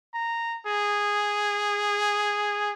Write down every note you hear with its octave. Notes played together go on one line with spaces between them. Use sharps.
A#5
G#4